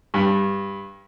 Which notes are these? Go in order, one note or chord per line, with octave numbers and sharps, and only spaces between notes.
G2